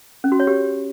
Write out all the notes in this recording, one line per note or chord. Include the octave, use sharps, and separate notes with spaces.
C#4
F#4
C#5
G4